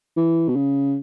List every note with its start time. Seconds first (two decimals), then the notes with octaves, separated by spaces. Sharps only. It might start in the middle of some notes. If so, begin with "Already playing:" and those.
0.17 E3
0.48 B2
0.56 C#3